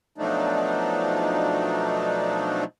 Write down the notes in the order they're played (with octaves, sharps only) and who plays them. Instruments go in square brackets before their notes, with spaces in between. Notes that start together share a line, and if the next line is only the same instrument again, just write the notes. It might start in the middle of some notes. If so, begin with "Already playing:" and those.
[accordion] B2 F3 F#3 A3 D4 D#4